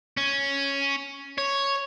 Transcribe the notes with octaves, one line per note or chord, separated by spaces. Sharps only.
C#4
C#5